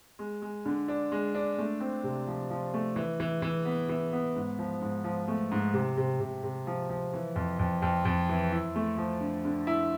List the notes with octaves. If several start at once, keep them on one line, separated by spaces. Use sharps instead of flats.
G#3
G#3
D3
D4
G#3
D4
A3
C4
C3
F3
F3
A3
E3
E3
E3
B3
E3
B3
G#2
F3
G#2
F3
A3
G#2
C3
C3
C3
C3
F3
F3
E3
F2
F2
F2
F2
E3
E4
A3
F3
D3
D3
E4